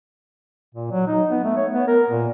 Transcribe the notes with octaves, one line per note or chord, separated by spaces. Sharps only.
A#2
F#3
D#4
B3
A3
C#5
B3
A#4
A#2